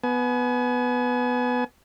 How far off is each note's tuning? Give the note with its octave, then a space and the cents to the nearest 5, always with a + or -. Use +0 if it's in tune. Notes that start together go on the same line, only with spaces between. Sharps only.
B3 +0 G#5 +35